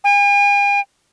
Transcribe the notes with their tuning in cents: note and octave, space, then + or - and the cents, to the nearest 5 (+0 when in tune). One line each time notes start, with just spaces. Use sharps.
G#5 -45